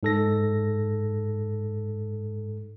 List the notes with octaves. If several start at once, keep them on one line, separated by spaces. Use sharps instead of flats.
G#2 A4 A#6